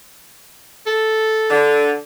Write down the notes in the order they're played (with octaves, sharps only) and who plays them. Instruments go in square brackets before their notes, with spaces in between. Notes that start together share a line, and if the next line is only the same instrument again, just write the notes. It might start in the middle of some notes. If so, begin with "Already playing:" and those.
[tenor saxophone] A4
[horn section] D3